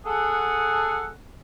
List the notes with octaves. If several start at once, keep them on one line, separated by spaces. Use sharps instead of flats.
G#4 A4 F#5